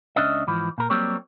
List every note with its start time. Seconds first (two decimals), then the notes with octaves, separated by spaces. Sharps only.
0.16 C#2 A#2 C#4 D4 D#5 E5
0.47 G#2 E3 F3
0.78 A#2 A#4
0.90 F#3 G3 A#3 C4 G4 C#5